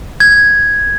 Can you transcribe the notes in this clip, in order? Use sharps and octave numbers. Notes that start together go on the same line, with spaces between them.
G#6